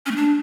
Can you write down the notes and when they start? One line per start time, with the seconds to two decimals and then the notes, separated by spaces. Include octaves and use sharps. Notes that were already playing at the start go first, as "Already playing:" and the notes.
0.06 C#4
0.11 A3
0.16 D4